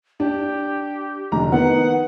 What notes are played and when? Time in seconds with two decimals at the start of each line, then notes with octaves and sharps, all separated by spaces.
0.20 D4 G4
1.32 F1 D3 A#5
1.52 D#3 B3 D#4 F#5